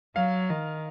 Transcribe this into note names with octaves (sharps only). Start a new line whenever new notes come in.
F#3 F5
D#3